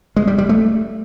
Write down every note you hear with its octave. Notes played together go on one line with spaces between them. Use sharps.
G#3
G3
G3
A3